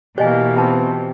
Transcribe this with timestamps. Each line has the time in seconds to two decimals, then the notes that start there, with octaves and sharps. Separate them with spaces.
0.18 B2 E3 A#3 G4 C5 D#5 G#5
0.56 C4 F4 B4 A5